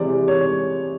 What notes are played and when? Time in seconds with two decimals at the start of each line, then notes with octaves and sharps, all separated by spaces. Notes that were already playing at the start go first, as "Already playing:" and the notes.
Already playing: C3 E3 G#3 C5 D5
0.28 C#5